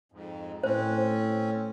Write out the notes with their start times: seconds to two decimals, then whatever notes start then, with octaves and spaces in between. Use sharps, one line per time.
0.12 F2 G#2
0.63 A2 C4 C#4 C5